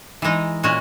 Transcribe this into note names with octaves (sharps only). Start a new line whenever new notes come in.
E3 G#3 D#4
A#2 G#3 C#4 F#4